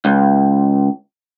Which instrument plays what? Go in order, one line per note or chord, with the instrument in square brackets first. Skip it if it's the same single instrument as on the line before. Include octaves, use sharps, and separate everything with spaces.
[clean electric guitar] C#2